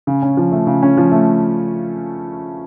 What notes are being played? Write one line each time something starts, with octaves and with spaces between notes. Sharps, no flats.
C#3
C#4
F3
A3
C#3
C#4
F3
A3